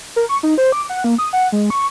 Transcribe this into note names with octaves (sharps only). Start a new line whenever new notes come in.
A#4
C#6
D#4
C5
D6
F#5
A#3
D#6
F#5
G#3
C#6